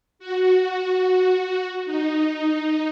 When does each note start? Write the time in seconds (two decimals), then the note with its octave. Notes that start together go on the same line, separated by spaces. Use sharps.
0.19 F#4
1.85 D#4